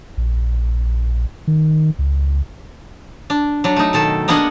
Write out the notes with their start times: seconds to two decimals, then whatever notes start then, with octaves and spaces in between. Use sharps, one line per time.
0.17 A#1
1.47 D#3
1.99 C#2
3.30 D4
3.64 F#3 D4
3.76 A3 D#4
3.93 B2 D#3 A4
4.28 A#3 B3 D4 G#4 D#5 F#5